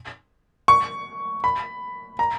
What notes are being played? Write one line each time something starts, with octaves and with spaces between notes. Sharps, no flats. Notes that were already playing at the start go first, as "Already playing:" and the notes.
C#6
B5
A#5